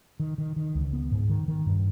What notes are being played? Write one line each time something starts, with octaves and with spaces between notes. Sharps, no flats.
D#3
D#3
D#3
C#2
B3
G#2
D#3
D#3
G2